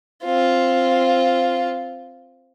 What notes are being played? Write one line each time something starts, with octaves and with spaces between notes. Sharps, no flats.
C4 F4